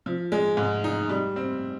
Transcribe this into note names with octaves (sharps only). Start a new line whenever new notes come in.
F3
G#3
G#2
D#4
G3
C4